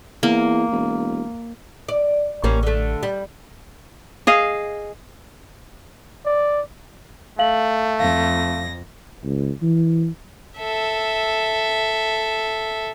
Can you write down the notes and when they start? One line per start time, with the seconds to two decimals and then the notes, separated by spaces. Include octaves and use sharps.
0.23 E2 A#3
0.72 E1
1.88 D5
2.44 A1 G3 A#3 C#4
2.63 D3 A3
3.03 G3
4.27 G#4 D#5 F5
6.26 D5
7.39 A3 F5 F#7
8.00 F2 F5 A#6
9.24 C#2
9.62 E3
10.59 A4 E5